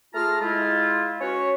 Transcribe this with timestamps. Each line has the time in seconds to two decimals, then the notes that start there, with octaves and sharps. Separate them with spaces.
0.14 A3 F4 G#4 A5 A#5 F6
0.42 G#3 E4 F4
1.21 C#4 F#4 B4 C#5